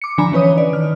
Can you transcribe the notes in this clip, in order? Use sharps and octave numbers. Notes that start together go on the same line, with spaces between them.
D6 C#7
D3 F3 D4 G#5 A#5 B5
E3 C#4 B4 C#5 D#6
D5
D#3 F6